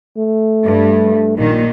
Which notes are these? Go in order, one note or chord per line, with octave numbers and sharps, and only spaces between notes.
A3
G2
A#1 A#2 D#3